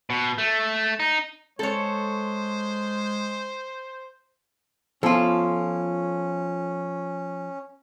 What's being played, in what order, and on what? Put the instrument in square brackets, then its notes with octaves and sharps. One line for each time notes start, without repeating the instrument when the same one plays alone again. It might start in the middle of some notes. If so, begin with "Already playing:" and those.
[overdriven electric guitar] B2
A3
D#4
[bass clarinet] G#3 [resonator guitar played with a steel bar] A4 C#5 [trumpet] C5
[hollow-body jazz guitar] F3 E4 [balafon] B3 [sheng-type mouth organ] C#4 [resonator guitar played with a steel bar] F4 A4